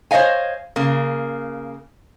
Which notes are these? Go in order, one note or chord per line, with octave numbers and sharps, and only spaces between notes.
C5 C#5 D#5 F5 G#5
C#3 A#3